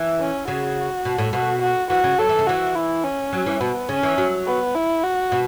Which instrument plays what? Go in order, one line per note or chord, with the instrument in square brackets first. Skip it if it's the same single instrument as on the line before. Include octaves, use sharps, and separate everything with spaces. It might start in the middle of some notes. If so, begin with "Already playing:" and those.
Already playing: [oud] E3
[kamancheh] C#4
[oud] C#3 [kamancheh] F#4
[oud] B2
A2
[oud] B2 [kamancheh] F#4
[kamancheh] F#4
[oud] E3 [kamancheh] F#4
[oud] C#3
[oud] F#3 [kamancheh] A4
[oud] E3
C#3
[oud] E3 [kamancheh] F#4
[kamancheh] E4
C#4
[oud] F#3
E3
[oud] B2 [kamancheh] B3
[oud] C#3 [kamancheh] C#4
[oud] E3
F#3
[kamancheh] B3
E4
F#4
[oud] B2